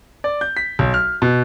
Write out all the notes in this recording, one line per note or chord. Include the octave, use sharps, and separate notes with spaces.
D5
G6
B6
B1
F6
B2